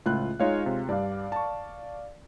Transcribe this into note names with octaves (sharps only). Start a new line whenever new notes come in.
C#2 A2 F4 F#6
G#3 D#4 F4 C#5 F5
C3
G2 D5 F5
A5 C#6